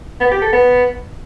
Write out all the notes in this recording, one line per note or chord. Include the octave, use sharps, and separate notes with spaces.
B3
G4
A4
B3